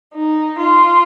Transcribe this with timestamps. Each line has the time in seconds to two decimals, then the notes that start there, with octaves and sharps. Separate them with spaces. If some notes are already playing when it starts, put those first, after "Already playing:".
0.14 D#4
0.60 F4